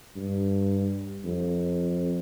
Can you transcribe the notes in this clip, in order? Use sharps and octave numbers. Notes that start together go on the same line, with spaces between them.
G2
F2